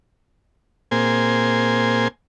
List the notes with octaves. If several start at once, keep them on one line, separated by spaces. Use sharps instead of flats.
A#2 A#3 C4 G#4 C5 G#5